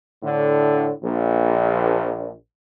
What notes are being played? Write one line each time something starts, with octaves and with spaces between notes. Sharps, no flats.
A2 D3
A#1